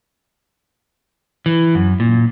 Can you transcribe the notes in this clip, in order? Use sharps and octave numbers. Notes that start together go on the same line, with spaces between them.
E3
F#2
A#2